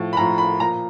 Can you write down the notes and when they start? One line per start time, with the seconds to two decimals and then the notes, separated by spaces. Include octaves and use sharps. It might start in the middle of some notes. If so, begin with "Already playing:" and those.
Already playing: A2 F3
0.13 B5
0.17 A2 F3 A#5
0.38 B5
0.60 A#2 F3 A#5